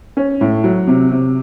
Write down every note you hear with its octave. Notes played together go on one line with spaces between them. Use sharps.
C#4
A2
F#3
C3
C3